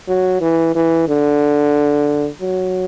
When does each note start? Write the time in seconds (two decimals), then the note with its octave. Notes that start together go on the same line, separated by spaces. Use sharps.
0.08 F#3
0.41 E3
0.75 E3
1.08 D3
2.41 F#3